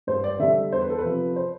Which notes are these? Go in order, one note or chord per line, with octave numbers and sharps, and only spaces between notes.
G2 C5
D5
D3 G3 E5
E2 C5
B4
A4
B4
C3 F3
C5